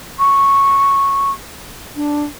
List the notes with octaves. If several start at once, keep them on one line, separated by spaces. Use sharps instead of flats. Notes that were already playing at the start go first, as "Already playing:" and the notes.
C#6
D4